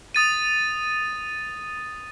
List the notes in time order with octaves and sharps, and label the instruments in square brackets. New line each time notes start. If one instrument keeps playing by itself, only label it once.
[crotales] D#6 A6 D#7